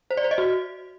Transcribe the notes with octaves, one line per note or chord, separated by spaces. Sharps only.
C5
D5
C5
D#5
F#4